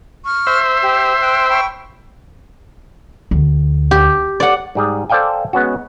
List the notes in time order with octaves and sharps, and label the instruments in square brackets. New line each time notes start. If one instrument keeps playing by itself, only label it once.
[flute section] C#6 F6
[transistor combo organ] C5 E5
[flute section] G4
G5 C6 F#6
G5 B5 C#6
[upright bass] D2
[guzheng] G4
D5 F#5
[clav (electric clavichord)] G#2 G3 G#4
A4 C5 D5 F5 G5 G#5
G#3 B3 C#4 F#4